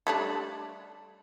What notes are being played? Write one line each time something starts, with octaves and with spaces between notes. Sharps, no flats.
G3 A3 D4